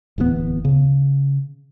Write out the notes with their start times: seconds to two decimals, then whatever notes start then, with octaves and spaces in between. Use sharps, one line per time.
0.18 D1 E2 D#3 B3
0.65 C#3